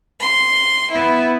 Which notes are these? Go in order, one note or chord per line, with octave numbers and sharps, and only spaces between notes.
C6
B3 E4